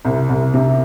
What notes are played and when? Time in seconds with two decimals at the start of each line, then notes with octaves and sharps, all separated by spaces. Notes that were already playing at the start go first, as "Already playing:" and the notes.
0.05 C2
0.29 C2
0.54 C3